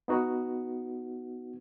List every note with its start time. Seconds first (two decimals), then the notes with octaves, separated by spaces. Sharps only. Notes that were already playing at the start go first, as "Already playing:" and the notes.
0.08 B3 D#4 F#4